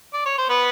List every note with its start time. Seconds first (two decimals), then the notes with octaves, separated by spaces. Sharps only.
0.14 D5
0.26 C#5
0.38 C5
0.49 B3 B4